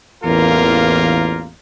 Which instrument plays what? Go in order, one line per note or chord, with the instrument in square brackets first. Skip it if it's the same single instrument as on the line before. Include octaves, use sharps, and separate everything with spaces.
[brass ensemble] A1 E2 A#3 F4 A#4